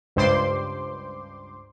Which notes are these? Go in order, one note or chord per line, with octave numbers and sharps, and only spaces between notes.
C#2 G2 C5 C6 D6